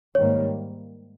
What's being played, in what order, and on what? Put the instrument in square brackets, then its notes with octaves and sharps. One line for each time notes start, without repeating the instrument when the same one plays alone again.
[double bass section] G#2 D#3 G3 A#3 [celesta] C#5